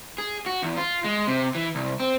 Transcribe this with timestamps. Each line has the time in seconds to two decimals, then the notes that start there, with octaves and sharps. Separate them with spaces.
0.18 G#4
0.46 F#4
0.63 E2
0.77 F4
1.04 G#3
1.27 C3
1.55 E3
1.75 C2
2.00 C4